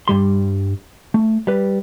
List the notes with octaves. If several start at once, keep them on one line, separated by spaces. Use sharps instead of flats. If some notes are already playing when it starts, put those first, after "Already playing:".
G2 G3 C6
A3
G3 B4